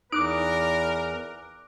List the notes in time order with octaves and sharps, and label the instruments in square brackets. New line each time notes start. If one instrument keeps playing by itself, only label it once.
[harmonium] E2 [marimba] D#4 [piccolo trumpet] A#4 [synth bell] D6 F#6 D7